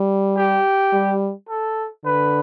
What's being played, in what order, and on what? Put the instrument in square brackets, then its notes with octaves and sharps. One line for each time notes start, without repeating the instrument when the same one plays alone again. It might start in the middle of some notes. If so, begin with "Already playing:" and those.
Already playing: [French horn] G3
[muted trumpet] G4
[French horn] G3
[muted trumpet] A4
[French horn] D3 [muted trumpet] B4